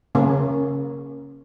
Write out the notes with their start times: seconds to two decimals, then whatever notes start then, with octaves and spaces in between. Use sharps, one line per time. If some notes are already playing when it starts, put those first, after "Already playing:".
0.15 C#3 A#3 C#4